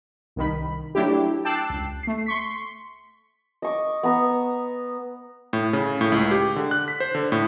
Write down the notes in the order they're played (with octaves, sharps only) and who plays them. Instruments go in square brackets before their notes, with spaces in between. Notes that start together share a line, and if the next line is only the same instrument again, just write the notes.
[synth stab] C2 D#3 B5
F#3 A3 D4 E4 G4
G5 A5 D6 E6 F#6 C7
C#2
A3 C7
C6 C#6 B6
[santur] D#5 C#6 D6
B3 A#5 C#6
[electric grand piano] A2
C#3
A2
C#2
G4
D3
F#6
B6
C5
D3
A2